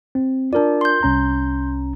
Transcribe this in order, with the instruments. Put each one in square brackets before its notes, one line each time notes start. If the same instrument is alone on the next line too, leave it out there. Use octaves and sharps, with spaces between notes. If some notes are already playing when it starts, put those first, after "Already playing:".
[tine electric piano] C4
[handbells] D4 D5 [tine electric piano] F4 A#4
[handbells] C6 G6
[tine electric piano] C2 C#4 A#5